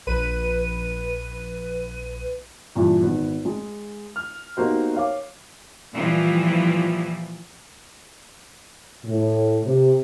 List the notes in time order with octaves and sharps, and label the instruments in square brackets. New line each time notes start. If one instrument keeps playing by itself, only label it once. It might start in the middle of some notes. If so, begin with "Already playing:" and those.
[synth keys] A#1 B4 D#7
[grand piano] G2 A#2 E3
G#1 B3
G#3
F6
A#3 B3 D#4 F#4 G4 C5
C#5 F5 D6
[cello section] A#2 E3 F3 G3
[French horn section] A2
C3